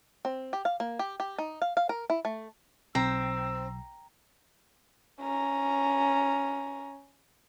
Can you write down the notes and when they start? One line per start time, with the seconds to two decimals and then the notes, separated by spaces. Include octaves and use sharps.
0.25 C4
0.53 G4
0.65 F5
0.80 A#3
0.99 G4
1.20 G4
1.38 D#4
1.62 F5
1.77 F5
1.89 A#4
2.10 E4
2.25 A3
2.95 B1 C4 A#5 E6
5.21 C#4 A#5